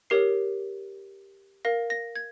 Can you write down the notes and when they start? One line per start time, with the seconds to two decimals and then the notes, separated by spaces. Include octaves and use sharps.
0.10 G4 A#4 C#5 C7
1.65 A#4 F5 A#6
1.90 A#6
2.15 G#6